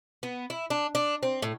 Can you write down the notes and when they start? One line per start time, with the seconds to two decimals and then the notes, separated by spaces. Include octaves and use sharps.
0.23 B3
0.50 E4
0.70 D4
0.95 D4
1.23 C4
1.42 A2